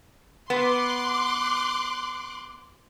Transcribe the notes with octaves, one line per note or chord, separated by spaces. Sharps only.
B3 C6 D6 F#6